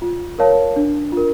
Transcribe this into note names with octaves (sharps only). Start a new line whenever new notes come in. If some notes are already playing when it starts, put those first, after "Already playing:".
F4
A#4 C#5 F5 A5
D4
F4 A#4